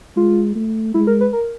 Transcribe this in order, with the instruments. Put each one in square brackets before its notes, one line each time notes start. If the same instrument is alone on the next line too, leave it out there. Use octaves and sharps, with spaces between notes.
[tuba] G#3 [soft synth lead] F4
[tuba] A3
[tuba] G#3 [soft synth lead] E4
[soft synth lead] A#4
B4
A#4